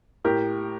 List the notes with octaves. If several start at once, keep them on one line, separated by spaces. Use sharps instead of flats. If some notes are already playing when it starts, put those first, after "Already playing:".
A2 G4 A#4